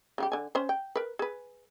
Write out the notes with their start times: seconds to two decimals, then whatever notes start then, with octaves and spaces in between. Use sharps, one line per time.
0.18 C#3 G3 G4
0.32 D3 G#5
0.55 C#4 C5
0.69 G5
0.96 A#4 B4
1.19 G#4 B4